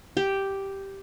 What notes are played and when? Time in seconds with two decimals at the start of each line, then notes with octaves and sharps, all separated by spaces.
0.17 G4